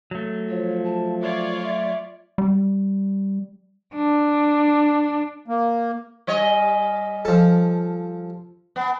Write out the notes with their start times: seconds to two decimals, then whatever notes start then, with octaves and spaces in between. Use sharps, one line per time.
0.11 F#3 A3
0.49 F3 C#5
0.84 A5
1.22 F4 C#5 D5 E5
1.63 E5
2.38 G3
3.95 D4
5.48 A#3
6.27 G3 C#5 D#5
7.25 F3 A4
8.76 B3